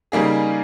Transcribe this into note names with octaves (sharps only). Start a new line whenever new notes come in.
C#3 G3 A#3 D#4 G#4